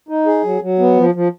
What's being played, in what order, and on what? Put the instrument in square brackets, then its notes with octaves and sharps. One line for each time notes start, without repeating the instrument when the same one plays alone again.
[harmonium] D#4
G#4
F#3
F#3
B3
F3
F3